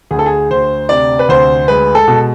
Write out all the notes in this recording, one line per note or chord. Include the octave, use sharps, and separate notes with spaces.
D2 G#4
A4
G#4
D2 C5
C3 D5
B4
D2 C5
G#3 B4
A4
B2